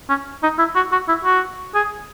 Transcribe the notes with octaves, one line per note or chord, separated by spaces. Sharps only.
C#4
D#4
E4
F#4
F#4
E4
F#4
G#4